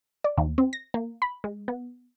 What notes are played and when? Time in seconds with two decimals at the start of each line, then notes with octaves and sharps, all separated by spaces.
0.24 D5
0.37 D#2
0.58 C4
0.73 A#6
0.94 A#3
1.22 B5
1.44 G#3
1.68 B3